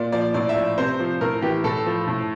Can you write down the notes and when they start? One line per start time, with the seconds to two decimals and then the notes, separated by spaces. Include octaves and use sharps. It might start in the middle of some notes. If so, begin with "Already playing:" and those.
Already playing: A#2 D5
0.12 F3 D5
0.34 A2 D5
0.49 E5
0.56 F3 D5
0.78 C3 C5
0.99 F3
1.21 A2 A#4
1.42 E3 G4
1.64 A2 A4
1.86 F3
2.07 A2